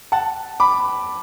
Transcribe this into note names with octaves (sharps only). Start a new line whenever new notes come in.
F#5 A5
B5 D6